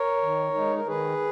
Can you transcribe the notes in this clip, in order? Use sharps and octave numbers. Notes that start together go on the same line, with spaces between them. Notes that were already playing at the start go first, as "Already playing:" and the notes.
Already playing: A#4 C#5
D#3
G#3 D#4
A#4
D#3 G#4 B4